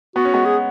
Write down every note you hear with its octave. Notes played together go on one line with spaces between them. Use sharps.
B3 F#4
C#4
G#3 B3
G#4